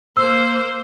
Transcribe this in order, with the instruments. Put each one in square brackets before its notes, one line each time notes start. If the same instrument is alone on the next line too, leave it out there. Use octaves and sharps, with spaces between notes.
[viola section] A#3 C5 [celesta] E6